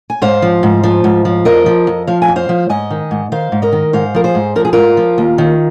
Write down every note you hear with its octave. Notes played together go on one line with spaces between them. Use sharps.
G#5
G#2 C5 F5
F3
G#2
F3
G#2
F3
F2 A#4 D#5
F3
F2
F3 F5
G#5
F2
C5 F5
F3
G#2 D#5 G#5
D#3
G#2
D#3 C5 F5
G#2
A#4 D#5
D#3
G#2 C5 F5
F3 A#4
G#4 C5
G#2
F3 A#4
G#4
G#2 F4 A#4
F3
D#2
D#3